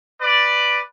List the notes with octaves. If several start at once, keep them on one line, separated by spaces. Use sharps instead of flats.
B4 D5